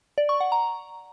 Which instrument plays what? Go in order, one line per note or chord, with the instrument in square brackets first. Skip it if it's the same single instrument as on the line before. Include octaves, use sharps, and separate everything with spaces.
[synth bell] D5
C#6
F#5
A#5